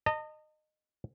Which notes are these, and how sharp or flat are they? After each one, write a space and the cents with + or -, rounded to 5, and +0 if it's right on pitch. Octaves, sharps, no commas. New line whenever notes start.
D#5 -20 A5 +45